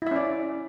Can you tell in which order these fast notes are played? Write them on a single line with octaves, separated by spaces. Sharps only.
E4 E5 C#4 D5